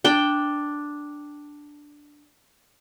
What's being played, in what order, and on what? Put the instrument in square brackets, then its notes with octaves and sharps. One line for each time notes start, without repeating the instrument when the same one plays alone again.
[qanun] D4 G5